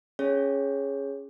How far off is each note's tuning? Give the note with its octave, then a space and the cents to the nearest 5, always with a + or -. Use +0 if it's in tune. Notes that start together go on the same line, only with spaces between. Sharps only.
C#4 +0 G#4 +0 C#5 +0